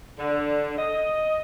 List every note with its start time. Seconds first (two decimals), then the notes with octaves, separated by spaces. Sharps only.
0.18 D3
0.78 D#5